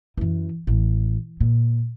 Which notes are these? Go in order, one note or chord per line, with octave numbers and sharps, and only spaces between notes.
F#2 E3
A1
A#2